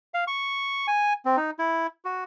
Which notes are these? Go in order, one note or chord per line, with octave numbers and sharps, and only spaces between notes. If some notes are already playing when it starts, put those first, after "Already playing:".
F5
C#6
G#5
C4
D#4
E4
F#4